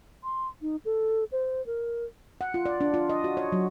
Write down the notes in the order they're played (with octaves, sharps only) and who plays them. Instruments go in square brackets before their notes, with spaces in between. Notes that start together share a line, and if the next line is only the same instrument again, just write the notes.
[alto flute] C6
D#4
A4
C5
A#4
[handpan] F#5
F4
D5
D4
F4
D#5
F#4
C#5
F#3